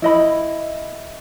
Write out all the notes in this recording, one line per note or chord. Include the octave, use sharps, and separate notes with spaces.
E4 D#5 B5